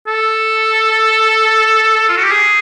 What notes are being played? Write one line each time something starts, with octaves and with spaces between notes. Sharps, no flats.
A4
F4
F#4
G4
G#4